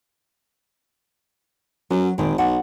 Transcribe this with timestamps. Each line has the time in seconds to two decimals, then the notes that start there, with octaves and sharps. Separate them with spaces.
1.90 F#2 F#3
2.18 G#1 A#2 D#3
2.38 B1 F#5